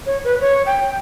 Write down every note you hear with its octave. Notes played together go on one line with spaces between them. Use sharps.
C#5
B4
C#5
G5